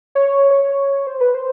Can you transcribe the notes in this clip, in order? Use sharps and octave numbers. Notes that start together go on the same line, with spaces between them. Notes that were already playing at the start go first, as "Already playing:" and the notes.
C#5
C#5
C5
B4
C5